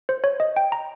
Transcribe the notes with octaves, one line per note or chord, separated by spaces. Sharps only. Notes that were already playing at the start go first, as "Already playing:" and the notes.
C5
C#5
D#5
G5
A#5